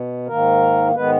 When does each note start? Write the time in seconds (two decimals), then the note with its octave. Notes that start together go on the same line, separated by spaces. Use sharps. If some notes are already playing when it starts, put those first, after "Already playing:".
Already playing: B2
0.28 G#2 D#3 A#3 A#4
0.95 G#2 D#3 G#3 B3 B4